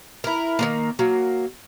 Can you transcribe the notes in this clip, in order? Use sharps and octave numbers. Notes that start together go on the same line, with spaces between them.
E4 A#4
D#3 G#3 A#3
F#3 A#3